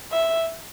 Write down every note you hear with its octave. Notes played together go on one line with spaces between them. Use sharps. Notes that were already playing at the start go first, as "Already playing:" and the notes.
E5